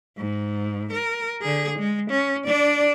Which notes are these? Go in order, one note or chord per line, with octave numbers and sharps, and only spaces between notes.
G#2
A#4
D3 G#4
G#3
C#4
D4 D5